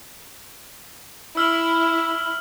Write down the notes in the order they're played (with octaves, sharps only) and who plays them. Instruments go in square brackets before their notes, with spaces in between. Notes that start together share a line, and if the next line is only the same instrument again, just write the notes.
[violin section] E4 [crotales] E6 F6 F#7